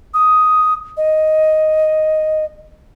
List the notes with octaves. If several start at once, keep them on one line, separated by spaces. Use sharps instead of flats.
D#6
D#5